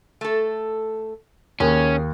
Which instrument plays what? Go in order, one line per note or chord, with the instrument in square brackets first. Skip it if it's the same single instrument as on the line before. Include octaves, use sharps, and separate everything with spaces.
[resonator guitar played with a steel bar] A3 A4
[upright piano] D#2 [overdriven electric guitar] C#4 [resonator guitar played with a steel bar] G#4